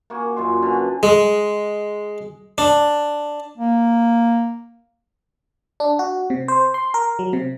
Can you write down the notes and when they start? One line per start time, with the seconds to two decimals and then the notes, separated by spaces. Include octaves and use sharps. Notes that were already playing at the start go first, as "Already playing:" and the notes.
0.10 A#3 F#4 F#5 G#5
0.36 F#2 A#2 F#4 C6
0.62 D3 C#4 B4
1.03 G#3
2.58 D4
3.58 A#3
5.80 D4
5.99 F#4
6.30 C3
6.48 C5
6.74 C6
6.94 A#4
7.19 F#3
7.33 C3